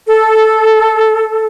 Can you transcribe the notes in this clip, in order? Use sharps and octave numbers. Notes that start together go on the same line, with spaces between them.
A4